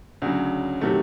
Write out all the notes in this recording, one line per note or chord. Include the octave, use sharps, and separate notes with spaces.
D2 C#3 F#3
C3 D#3 F#3 A3